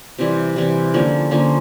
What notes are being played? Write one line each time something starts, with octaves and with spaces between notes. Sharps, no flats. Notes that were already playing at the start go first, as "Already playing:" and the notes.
C3 E3 G3
C3 E3 G3
D3 F3 A#3 C#4
D3 F3 A#3 C#4